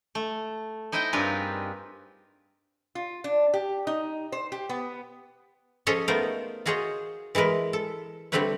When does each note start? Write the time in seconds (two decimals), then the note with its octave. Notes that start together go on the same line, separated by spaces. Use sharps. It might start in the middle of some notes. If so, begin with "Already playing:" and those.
0.15 A3
0.92 D#4 E4 C5 D#5 G5
1.13 G2 C4 F4 G#4 A#4 B4
2.95 F4
3.24 D4
3.54 G4
3.87 D#4
4.32 C5
4.52 G4
4.69 B3
5.87 F3 C#4 G#4 A4 C#5 D#5
6.08 A3 B3 D#4 F4 A#4 C5
6.66 F4 F#4 G#4 C5 C#5 D#5
7.35 E3 G#3 E4 A#4 B4
7.73 A4
8.32 D3 G3 A3 C4 B4 C#5